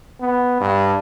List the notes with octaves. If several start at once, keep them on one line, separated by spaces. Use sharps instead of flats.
B3
G2